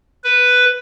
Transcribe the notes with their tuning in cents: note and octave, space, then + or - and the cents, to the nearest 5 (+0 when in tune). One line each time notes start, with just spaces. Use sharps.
B4 +5